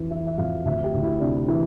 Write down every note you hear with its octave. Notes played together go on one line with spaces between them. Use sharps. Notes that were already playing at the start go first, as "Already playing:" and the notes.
Already playing: F2 E3
E3 E5
E5
F2 F5
D2 E5
G4
D2
E4
C3 D4
E3 E4